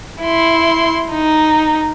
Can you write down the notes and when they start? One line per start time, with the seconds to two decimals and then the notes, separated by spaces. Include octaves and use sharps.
0.23 E4 C6
1.12 D#4